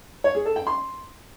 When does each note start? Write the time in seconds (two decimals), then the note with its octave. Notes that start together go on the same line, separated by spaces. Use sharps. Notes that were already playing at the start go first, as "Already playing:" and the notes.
0.24 C#5
0.35 G#4
0.45 A4
0.56 G5
0.67 C6